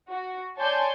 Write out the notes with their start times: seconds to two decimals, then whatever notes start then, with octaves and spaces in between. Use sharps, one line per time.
0.11 F#4
0.60 C#5 D5 G#5 A5 C6 G6